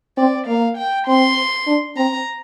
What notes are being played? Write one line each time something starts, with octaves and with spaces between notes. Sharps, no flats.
C4 D5
A#3 F5
G5
C4 C6
D4
C4 A#5